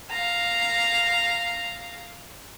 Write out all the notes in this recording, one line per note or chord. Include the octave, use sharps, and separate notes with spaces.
F5 A#5